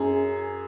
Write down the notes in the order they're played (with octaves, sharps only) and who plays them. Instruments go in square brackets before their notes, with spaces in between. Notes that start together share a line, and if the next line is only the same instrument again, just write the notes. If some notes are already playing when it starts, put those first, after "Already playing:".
Already playing: [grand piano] F#2 G#4